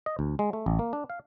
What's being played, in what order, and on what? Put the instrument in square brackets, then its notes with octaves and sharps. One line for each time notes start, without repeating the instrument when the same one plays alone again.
[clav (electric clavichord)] D#5
D2
G#3
A3
A1
A#3
D4
F5